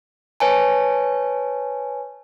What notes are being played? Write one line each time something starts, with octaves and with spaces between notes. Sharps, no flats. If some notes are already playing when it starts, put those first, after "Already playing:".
B4 C#5 G#5 A5